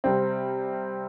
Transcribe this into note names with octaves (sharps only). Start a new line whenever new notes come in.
C3 G3 C4